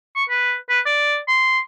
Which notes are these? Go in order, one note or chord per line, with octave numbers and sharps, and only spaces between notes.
C#6
B4
B4
D5
C6